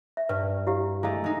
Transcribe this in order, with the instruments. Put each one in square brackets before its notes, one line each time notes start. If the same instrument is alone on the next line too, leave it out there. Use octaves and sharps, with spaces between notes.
[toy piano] E5
[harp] G2 [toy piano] B4
[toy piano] E4 G4 F5
[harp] G#3 A3 [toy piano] E4 G#4 F5
[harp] G#3 D#4